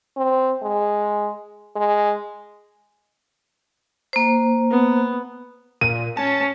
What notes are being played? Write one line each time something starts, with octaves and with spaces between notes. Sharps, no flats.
C4
G#3
G#3
A#3 C5
B3
A#2 D#7
C#4 A5